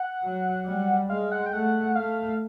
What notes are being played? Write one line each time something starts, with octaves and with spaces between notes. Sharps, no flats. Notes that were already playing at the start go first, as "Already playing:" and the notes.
Already playing: F#5
F#3
G3
G#3 F5
F#5
G5
A3 F#5
A3 F5